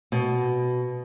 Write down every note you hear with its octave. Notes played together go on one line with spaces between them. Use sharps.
B2